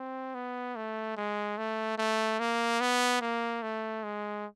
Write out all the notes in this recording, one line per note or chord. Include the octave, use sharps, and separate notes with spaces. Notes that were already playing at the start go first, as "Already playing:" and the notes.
Already playing: C4
B3
A3
G#3
A3
A3
A#3
B3
A#3
A3
G#3